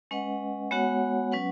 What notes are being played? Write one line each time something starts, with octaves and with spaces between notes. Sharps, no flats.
G#3 C#4 B4 D#5 F#5
G#3 B3 F#4 C#5 F#5
F#3 C#4 B4 F#5